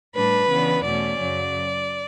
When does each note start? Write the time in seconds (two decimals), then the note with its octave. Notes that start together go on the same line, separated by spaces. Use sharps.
0.15 A2 G3 D4 B4
0.49 C#3 E3 B3 D4
0.84 E2 B2 A3 C#4 D5
1.18 F#2 C#3 F#3